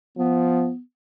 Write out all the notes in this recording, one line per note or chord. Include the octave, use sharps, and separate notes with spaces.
F3 B3